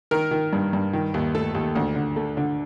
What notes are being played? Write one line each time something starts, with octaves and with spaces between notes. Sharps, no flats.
D#3 A#4
D#3
G2
G2
D#3
D#2
A3 A4
D#2
D2
D3
A3
D3